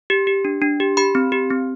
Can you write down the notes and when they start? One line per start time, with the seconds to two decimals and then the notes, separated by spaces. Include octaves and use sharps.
0.10 G4
0.27 G4
0.45 D4
0.62 D4
0.80 G4
0.97 G4 B5
1.15 C4
1.32 G4
1.50 C4